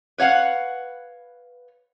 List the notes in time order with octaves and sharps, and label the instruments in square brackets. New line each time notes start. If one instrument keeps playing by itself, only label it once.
[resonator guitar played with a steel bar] B4 C#5 F5 F#5